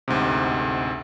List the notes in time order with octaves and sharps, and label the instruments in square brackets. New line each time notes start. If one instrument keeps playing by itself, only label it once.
[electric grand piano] A1 D2 G#2 C3